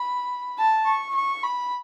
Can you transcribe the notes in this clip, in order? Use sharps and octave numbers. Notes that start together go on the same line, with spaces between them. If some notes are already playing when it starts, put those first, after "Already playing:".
Already playing: B5
A5
C#6
C#6
B5